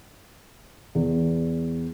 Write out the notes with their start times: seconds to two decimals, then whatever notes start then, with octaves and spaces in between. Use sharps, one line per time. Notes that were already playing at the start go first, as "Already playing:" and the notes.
0.95 E2